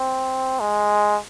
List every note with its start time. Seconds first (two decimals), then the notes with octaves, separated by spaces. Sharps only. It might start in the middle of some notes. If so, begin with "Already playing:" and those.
Already playing: C4
0.60 G#3